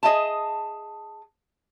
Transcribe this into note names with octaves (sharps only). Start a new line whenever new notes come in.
G#4 D#5 E5 A5